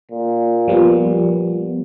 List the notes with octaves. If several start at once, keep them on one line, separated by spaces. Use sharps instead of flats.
A#2
F3 G3 B3